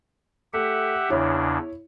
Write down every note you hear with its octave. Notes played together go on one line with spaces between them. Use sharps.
A3 G4 E5 F#5
E2 C#3 D4 E4 C#5